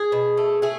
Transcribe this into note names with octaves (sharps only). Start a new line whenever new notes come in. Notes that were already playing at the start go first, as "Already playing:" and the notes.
Already playing: G#4
B2
A3
A3 G#4